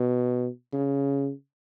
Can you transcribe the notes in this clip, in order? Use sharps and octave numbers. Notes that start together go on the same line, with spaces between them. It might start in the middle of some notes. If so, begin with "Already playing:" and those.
Already playing: B2
C#3